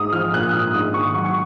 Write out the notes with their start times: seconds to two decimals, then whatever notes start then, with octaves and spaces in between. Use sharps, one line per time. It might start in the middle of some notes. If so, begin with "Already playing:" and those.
Already playing: G#2 D#6
0.13 F3 F6
0.33 A#2 F#6
0.49 D#6
0.53 A#2 F6
0.74 G#2 D#6
0.94 D#3 C#6
1.14 F#3 C#6
1.25 C#6